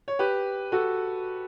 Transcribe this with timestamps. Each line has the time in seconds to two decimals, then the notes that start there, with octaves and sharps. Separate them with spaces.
0.08 C#5
0.19 G4 B4
0.72 F#4 A4